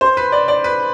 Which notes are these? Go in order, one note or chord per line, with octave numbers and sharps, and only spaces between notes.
C5
B4
D5
D5
B4